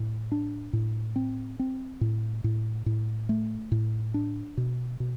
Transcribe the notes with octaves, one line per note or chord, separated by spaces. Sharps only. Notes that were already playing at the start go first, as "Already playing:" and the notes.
Already playing: A2
D4
A2
C4
C4
A2
A2
A2
A3
A2
D4
B2
B2